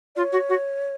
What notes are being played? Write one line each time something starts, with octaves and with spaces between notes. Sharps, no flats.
F4 D5
C#5
F#4
F#4